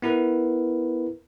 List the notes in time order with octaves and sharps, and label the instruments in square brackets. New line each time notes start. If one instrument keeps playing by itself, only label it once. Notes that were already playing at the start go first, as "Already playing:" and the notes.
[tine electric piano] B3 E4 A#4 B4